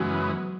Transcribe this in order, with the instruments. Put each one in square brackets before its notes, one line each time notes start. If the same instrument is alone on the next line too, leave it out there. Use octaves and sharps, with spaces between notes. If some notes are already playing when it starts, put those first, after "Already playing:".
Already playing: [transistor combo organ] F#2 C#3 E3 G#3 B3 [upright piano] F#3